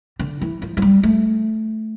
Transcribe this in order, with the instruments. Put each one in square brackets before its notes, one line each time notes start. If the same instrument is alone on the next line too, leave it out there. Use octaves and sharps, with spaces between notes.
[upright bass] D3
E3
F3
F3
G3
A3